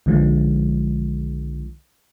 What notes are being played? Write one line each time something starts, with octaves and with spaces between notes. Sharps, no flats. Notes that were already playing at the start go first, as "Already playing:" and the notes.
B1 D3 D#3 F3 G#3